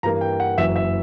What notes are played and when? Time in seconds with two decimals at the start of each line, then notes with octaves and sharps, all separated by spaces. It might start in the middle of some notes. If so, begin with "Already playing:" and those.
0.03 G2 E3 G3 A#3 A#5
0.21 G5
0.40 F#5
0.58 F#1 F#2 E3 E5
0.76 E5